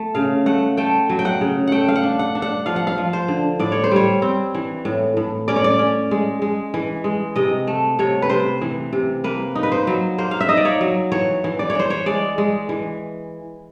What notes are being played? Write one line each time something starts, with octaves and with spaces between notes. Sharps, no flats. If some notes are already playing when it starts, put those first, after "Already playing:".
Already playing: A3
C#3 F5
A3 F#5
A3 G5
F#3
G5
F#5
C#3
A3 F#5 G5
F5
F#5
D4
F#5
D4
F#5
F3 F5
F#5
F5
F3
C5
D3
A2 D5
C#5
C5
G3 C#5
C4
E3
A2
A2
C#4 D5
C#5
D5
C#4
G#3
G#3
E3
G#3
C3 D#5
A3
C3 C#5
B4
C3 C5
E3
C3
A#3 B4
D#4
B4
C5
F#3
A#3 C5
F5
E5
D#4 D#5
D5
C#5
F#3
E3 C#5
E3
D5
C#5
E3 C5
C#5
G#3 D5
G#3
E3